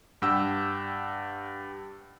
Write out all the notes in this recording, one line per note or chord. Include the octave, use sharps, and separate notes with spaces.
G2 G4 F#5 G5 E6